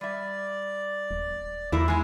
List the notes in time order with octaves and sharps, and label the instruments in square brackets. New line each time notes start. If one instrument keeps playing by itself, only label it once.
[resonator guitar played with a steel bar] G3 E5 [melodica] D5
[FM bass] D#1
[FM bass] E2 [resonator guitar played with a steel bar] E3 A#3 E4
[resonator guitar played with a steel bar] G#3 E4 [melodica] G#5